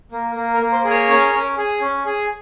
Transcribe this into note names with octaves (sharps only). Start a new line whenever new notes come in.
A#3
A#3
A#4
A#3
C5
G#4
A#4 C#5
C#4
C#4
G#4
C#4
G#4